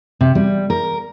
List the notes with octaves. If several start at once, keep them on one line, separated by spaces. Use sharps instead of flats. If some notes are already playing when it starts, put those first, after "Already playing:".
C3
G3
A#4